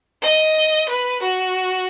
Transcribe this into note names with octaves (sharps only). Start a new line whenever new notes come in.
D#5
B4
F#4